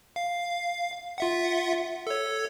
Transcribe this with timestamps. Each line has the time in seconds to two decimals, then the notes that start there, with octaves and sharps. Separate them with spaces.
0.16 F5
1.18 F4 E5 F#5
2.07 A4 C#5